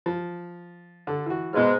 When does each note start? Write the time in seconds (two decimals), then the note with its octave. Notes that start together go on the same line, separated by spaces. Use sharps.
0.06 F3
1.07 D3 A4
1.26 E3 F#4
1.53 G#2 B2 G#3 B4 F6